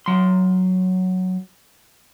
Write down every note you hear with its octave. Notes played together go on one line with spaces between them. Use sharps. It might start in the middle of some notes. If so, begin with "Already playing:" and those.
F#3 C6